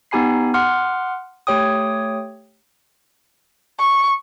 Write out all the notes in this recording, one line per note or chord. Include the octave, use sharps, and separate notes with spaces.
B3 D#4 G4 G#5 B5 C7
F#5 C6 D6 F6
A3 G4 C#5 G5 D#6
C#6